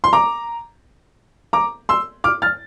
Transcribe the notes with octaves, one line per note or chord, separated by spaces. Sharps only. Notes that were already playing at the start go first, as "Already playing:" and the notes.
C6
A#5 D6
A#5 D6
C6 E6
D6 F6
F6 A6